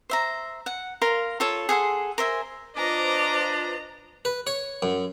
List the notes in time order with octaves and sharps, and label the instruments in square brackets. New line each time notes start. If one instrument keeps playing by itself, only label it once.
[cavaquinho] C5 E5 A#5
F#5
A#4 F5 C6
F4 A4 C#5
G#4 A4 F#5 C6
A#4 C5 E5 G#5
[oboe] D4 [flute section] F4 B4 C5 [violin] D#5 A#5 [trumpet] D6
[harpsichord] B4
C#5
F#2